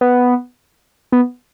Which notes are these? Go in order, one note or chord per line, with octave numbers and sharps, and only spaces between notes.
B3
B3